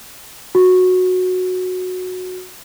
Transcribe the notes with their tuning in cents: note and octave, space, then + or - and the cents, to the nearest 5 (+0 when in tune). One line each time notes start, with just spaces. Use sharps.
F#4 -10